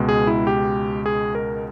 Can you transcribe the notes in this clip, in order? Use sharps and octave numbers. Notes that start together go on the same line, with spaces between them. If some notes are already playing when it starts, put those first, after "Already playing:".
Already playing: C#2 B2 G#3
G#4
E4
G4
G#4
A#4